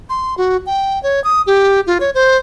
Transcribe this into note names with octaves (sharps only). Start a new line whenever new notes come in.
C6
F#4
G5
C#5
D#6
G4
F4
C#5
C5